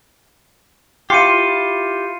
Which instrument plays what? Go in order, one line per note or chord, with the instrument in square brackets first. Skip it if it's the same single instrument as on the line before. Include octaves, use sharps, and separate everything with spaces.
[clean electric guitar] E4 G4 [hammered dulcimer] F4 [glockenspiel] C7 C#7 D#7